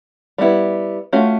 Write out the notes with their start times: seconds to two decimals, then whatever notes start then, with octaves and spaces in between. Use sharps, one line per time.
0.38 G3 B3 E4
1.13 A3 C#4 F4 F#4